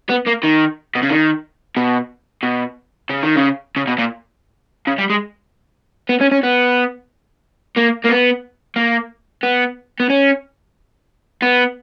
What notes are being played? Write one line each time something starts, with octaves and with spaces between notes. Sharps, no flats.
B3
A#3
D#3
B2
C#3
D#3
B2
B2
C#3
D#3
C#3
C#3
B2
A#2
C#3
G3
G#3
B3
C#4
C#4
B3
A#3
A#3
B3
A#3
B3
B3
C#4
B3